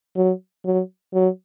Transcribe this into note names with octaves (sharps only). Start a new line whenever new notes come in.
F#3
F#3
F#3